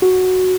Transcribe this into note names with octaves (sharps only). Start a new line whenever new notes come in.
F#4